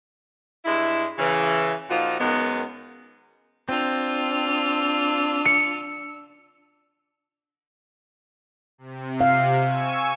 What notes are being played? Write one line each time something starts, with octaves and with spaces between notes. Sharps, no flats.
G2 G#3 E4
C#3 E3
A#2 F3 D#4 F4 F#4
F#2 D#3 G#3 B3
C4 D4 F4 E6 F7
C#7
C3
F5
G#5 C#6 E6